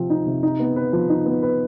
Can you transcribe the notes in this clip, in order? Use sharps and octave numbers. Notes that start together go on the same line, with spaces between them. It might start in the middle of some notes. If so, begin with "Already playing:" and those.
Already playing: C3 F3 C4
D#4
C3
D#4
B3
B4
F3
D#4
B3
B4